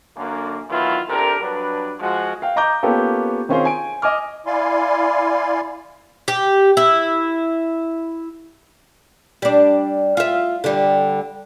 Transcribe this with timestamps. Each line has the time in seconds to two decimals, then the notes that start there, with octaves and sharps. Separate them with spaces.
0.17 F#2 D3 A#3
0.70 D#3 E3 F#3 B3 E4 F4
1.09 C3 D4 G4 A4 A#4
1.41 G2 F#3 D4 B4
1.99 F3 G#3 F#4
2.42 F5 G5
2.56 D#5 A#5 D6 G6
2.83 A#3 B3 C#4 F4 G4 A4
3.49 D#3 C4 C#4 F4 G#4 C5
3.65 G#5 D7
4.02 D#5 G#5 D6 F6
4.46 E4 D5 F5 G#5 C6
6.28 G4
6.77 E4
9.42 G3 D4
10.17 F4 E5
10.64 D3 G3